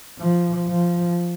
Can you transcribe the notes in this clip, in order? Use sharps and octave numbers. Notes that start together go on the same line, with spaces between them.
F3
F3